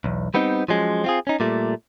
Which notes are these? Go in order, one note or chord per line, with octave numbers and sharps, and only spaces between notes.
B1 E2
G3 B3 C4 D#4
F3 F#3 G#3 C#4
C4 F4 G#4
C#4 D#4
A#2 G3 A3